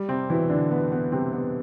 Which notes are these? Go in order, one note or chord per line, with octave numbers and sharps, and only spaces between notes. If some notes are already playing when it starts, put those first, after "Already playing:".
Already playing: G3
C3 C4
B2 E3 E4
D3 D4
B2 B3
B3
C3 G3 C4
B3